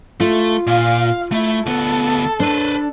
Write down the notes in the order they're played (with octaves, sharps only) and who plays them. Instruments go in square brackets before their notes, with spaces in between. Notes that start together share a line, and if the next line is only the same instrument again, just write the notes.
[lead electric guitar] A3 [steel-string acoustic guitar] F4
[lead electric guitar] A#2 [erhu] F5
[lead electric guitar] A3 [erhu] E4
[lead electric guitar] D2 B3 [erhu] A4
[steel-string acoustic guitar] D4 [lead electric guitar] B4 C5